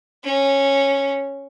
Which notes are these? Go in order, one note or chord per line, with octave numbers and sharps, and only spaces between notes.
C#4